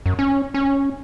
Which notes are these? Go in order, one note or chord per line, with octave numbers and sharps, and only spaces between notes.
F#2
C#4
C#4